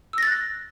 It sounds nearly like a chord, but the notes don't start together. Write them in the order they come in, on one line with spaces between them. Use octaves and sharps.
E6 A#6 A6 F#6